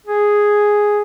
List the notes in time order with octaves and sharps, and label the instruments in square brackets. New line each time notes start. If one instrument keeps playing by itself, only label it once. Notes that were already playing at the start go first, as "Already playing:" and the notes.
[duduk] G#4